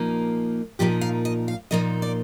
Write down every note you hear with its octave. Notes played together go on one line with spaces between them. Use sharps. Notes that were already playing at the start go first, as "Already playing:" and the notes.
Already playing: A#2 F3 A#3 D#4
A#2 F3 A#3 D#4 G4
F5
D#5
F5
A#2 F3 A#3 D#4 D#5
D5